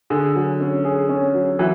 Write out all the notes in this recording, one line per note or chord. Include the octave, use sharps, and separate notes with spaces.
D3 G#4
F#3
C#4
G#4
C#4
F#3
E3 F#3